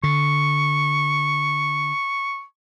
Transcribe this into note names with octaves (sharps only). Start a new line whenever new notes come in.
D3 C#6